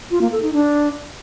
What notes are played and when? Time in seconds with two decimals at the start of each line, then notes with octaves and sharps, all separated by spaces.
0.11 F4
0.21 A#3
0.32 A4
0.43 D#4
0.53 D4